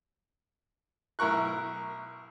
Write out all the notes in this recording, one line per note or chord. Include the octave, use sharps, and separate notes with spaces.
B1 E4 A#4 C#6 F#6